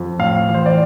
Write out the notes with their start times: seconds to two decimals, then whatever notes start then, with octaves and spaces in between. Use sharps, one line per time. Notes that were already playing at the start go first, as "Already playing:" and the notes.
Already playing: F2
0.19 A2 F5
0.48 E3
0.55 C5
0.66 D5